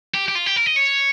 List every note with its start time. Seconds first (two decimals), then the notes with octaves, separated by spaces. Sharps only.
0.14 G4
0.28 G4
0.35 F4
0.46 G4
0.56 A#4
0.66 D#5
0.76 C#5